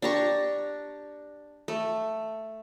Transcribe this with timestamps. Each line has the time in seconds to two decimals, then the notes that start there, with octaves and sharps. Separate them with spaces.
0.02 D4 G4 A#5 C#6
1.68 A3